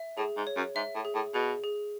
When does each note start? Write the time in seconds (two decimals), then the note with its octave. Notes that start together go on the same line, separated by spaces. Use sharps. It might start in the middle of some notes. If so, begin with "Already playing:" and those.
Already playing: E5
0.17 A2 G#4
0.37 G#2
0.47 C#5
0.56 F#2
0.76 G#2 E5
0.95 A2
1.05 G#4
1.15 A2
1.34 B2 G#4
1.64 G#4